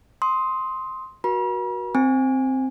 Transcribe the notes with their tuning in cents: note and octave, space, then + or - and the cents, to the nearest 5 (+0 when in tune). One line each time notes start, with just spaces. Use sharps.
C6 +0 D#6 +25
F#4 +0 A#4 +45 B5 -45
C4 +0 G#5 -15